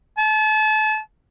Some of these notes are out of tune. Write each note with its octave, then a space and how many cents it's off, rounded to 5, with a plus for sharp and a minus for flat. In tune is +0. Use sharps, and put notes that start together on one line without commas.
A5 -35